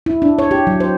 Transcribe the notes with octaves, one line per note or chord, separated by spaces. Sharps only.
E4
D4
C#5
G4
F#3
C5